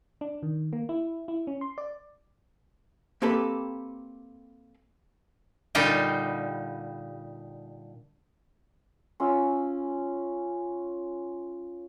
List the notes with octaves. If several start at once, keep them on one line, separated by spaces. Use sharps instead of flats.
D4
D#3
A#3
E4
E4
C#4
C6
D5
A#3 C4 G4 A4 B4
A#2 D3 G3 D#4 F5 G5
C#4 F4 E6